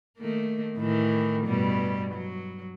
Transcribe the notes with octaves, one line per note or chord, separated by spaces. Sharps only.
D#3 A3 A#3
A2 D#3 E3
G2 B2 G3
F#3